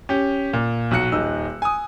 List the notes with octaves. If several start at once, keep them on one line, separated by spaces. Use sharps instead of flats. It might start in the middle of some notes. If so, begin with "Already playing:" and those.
C#4 G4
A#2
B1 F#4 F#6 C#7
D#1 D#4 E6
G#5 D#6